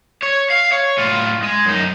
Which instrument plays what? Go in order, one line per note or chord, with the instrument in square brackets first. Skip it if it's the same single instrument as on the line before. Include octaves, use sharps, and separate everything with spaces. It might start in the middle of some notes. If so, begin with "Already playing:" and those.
[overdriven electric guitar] C#5
F5
C#5
A2 F4
G#3
F#2 D#4